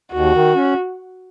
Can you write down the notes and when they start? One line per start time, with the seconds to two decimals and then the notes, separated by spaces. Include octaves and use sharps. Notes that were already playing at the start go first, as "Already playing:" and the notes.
0.13 D#2 F#4
0.34 D#3
0.55 C#4